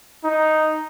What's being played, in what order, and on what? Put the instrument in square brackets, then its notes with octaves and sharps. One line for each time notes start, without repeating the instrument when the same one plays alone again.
[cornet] D#4